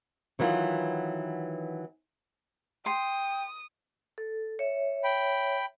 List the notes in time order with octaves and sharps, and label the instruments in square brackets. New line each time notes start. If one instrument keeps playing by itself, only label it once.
[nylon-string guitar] D#3 E3 F#3 B3 F4
[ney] G5 [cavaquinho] C6 [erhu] D#6
[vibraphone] A4
C#5 E5
[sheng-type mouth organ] G5 B5